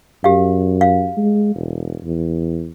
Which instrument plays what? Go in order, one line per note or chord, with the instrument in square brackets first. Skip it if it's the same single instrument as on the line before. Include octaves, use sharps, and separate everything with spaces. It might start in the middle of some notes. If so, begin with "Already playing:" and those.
[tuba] F#2 [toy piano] G4 F5
[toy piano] F5
[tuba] G#3
E1
E2